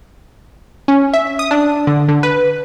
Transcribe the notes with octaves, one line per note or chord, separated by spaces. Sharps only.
C#4
E5
D#6
D4
D3
D3
B4